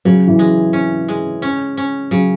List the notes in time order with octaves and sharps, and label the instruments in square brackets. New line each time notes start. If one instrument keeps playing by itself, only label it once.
[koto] C#3 [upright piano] F#3
[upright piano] E3
[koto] G#3
C#4
G#3
C#4
C#4
[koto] C#3 [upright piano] F#3